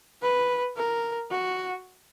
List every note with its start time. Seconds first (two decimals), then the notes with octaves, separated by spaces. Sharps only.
0.22 B4
0.76 A#4
1.31 F#4